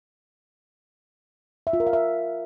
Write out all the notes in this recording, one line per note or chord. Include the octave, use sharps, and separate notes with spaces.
E5
F4
A#4
F5
E5